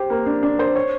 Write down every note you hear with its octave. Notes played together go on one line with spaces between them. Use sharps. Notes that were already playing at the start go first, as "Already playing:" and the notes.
Already playing: G4 C5
A#3
D4
D4
C5
C#5